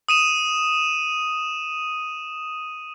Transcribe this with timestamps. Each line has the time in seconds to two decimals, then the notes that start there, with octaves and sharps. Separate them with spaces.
0.09 D#6 D#7 E7